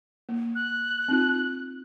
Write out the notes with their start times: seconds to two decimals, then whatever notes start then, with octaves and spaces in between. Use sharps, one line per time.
0.29 A#3
0.55 F#6
1.08 C4 D#4 F4